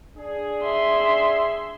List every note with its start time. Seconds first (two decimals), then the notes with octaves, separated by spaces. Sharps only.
0.17 D4 G#4
0.64 E5 C6